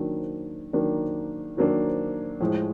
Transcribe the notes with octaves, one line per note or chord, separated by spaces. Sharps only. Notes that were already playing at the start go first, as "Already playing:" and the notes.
Already playing: D#3 F#3 A#3 D4
D#3 F#3 A#3 D4
D#3 F#3 A#3 D4
A2 F3 G#3